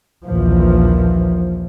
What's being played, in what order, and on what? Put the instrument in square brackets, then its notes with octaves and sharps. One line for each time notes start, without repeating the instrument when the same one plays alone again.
[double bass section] A#1 D#2 E3 F3